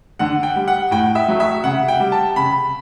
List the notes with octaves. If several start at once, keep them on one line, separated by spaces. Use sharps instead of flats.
D3 F#5
G5
G3
F#5
A2 G5
E5
F#3 A3
E5
C#3 F#5
G5
G3
A5
C#3 B5